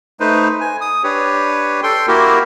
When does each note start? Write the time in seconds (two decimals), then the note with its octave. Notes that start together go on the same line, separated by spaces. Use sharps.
0.20 A3 D#4 B4 C5
0.61 G#5
0.81 D#6
1.04 D4 G4 B4 C#5
1.83 A4 G5 C6
2.08 A#3 E4 F#4 G4 A#4